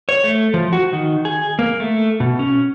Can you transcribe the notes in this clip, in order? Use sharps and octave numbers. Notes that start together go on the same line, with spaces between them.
C#5
A3
F3
F#4
D#3
G#4
A#3
A3
B2
C#4